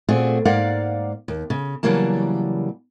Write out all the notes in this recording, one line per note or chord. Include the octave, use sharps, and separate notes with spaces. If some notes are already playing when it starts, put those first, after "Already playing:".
A#2 A3 C4 F#4 G#4
G#2 A#3 D5 F5 F#5
D#2
C#3
C#3 E3 F#3 G3 A#3 A5